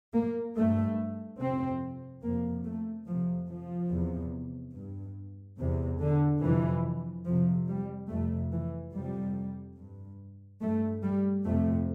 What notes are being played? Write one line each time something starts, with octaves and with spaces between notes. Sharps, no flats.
A#3
G2 A3
F2 C3 C4
F2 C3 A#3
A3
F2 C3 F3
F3
E2 C3
G2
E2 C3
D3
F2 C3 E3
F2 C3 F3
G3
F2 C3 A3
E3
F2 C3 G3
G2
G2 A3
G3
F2 C3 A3